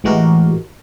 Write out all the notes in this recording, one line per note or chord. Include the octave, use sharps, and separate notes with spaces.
A1 E3 G#3 F#4 G4 A#4